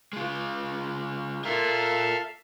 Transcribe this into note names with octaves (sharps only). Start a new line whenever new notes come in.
G#3 F4
F4 A4 A#4 E5 F5